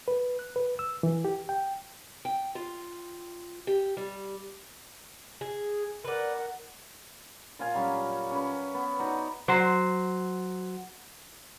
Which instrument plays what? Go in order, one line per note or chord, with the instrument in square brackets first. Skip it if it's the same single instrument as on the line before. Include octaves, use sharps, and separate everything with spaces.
[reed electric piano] B4
F#6
B4
E6
E3
G4
G5
[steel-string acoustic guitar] G5
F4
G4
G3
[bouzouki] G#4
[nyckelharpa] A#4 F#5 [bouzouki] B4 D5
[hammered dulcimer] A#2 F4 F5 G#5
F#3 G3 C#4
C#4 B4
B3
D#4 F#4 D5
[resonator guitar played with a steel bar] F#3 C5